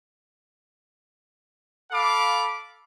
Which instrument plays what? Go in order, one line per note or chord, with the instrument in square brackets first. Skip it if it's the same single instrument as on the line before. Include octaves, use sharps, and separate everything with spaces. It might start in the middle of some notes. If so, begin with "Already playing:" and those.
[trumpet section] A4 F5 B5 D6